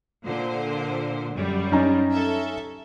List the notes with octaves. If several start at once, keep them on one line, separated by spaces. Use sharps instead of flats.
A#2 D3 C5
F#2 G3
C#4 D#4 A#5
A4 E5